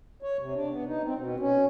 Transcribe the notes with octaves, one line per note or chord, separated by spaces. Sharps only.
C#5
C3
D4
B3
D#4
C4
B2
C#4